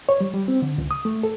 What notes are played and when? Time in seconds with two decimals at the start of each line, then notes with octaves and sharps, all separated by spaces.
0.09 C#5
0.21 G3
0.34 G3
0.48 C4
0.62 D3
0.78 C#2
0.91 D#6
1.05 A3
1.23 A4